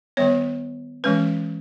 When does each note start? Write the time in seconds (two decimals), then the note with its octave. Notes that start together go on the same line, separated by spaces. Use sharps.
0.17 D#3 G3 B3 C#5
1.04 E3 G#3 C#4 B4